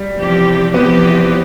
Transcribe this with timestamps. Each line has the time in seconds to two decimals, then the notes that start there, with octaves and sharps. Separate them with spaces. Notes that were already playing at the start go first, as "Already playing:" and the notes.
Already playing: G3
0.16 E2 C3 F3 C4 G4
0.74 E2 C3 F3 B3 C4 G4